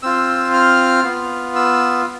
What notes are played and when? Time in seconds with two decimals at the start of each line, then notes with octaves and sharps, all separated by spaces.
0.02 C4 F4 E6
0.53 F6
1.04 B3 F4
1.55 E6